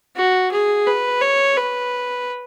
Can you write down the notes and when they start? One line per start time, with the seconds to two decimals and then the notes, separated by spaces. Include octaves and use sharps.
0.16 F#4
0.52 G#4
0.87 B4
1.21 C#5
1.57 B4